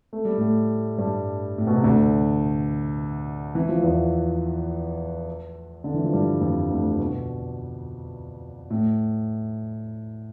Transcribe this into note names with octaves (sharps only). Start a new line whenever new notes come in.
A3
G3
A2 A3
G2 G3
A2
B2
C3
D2 D3
E3
F3
E2 E3
D3
E3
F3
G2 G3
F2 F3
D2 D3
B2
A2